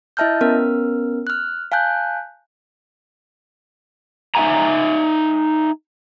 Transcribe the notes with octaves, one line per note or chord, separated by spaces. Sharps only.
E4 D#5 E5 A5 F6 G6
B3 C#4 A#4 F6
F6 F#6
F5 G#5 A5 F#6 G6
D#4 E5 F5 G#5 A#5